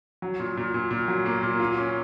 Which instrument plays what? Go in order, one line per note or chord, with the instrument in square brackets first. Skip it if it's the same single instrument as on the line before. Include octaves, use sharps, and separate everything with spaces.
[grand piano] F#3
A#2
A#2
A#2
A#2
F#3
A#3
A#2
F4
C#4